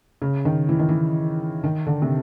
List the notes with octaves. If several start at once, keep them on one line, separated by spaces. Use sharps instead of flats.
C#3
D#3
E3
D#3
E3
D#3
D3
C3